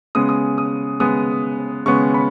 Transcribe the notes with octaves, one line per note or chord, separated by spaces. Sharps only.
C#3 G#3 B3 D#6
D#6
D#6
C#3 G#3 B3 D#6
C#3 G#3 B3 C#6
B5